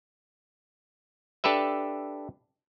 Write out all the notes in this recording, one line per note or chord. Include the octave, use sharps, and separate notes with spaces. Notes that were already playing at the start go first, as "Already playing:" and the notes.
D4 G4 A4 B4 E5